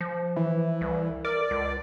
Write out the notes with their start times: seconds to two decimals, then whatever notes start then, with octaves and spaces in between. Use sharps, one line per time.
0.01 F3
0.36 E3
0.81 C2
1.25 A#4 D5
1.51 C#2